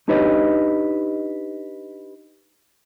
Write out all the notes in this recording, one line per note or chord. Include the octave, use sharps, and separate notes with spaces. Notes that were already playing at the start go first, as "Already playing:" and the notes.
D4 D#4 G4 B4 C#5 D#5